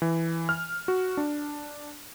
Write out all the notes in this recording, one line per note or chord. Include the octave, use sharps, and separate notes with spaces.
E3
F6
F#4
D4